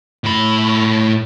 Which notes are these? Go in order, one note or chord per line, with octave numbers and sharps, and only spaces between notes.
A2 B5